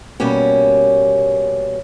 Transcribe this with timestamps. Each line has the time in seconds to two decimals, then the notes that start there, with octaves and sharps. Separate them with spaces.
0.20 B2 G3 A#3 C#4 G4